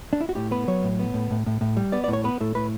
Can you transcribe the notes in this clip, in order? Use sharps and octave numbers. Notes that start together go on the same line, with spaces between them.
D4
E4
F#4
A2 G4
B3 B4
F#3 C#5
A2
B3
A2
A2
A2
A2
G3
B3 D5
D5
A2
C#5
B3 B4
A2 A4
A2 B4